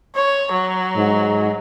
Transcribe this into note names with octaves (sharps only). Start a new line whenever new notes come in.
C#5
F#3
G#2